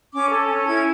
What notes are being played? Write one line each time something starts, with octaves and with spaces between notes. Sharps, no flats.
C#4 D6
A4
C#4
E4 G#6